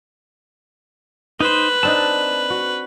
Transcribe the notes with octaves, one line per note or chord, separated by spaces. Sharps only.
D#4 B4 C5
C4 D4 D#4 A5
F#4